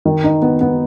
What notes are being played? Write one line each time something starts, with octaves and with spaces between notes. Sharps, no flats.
D#3
D#4
B3
B3